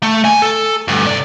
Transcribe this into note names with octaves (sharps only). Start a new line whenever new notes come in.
A3
D2 G#5
A4
D2 G2
C3 D5